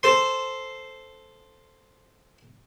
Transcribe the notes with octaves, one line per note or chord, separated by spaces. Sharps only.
A4 C5 C6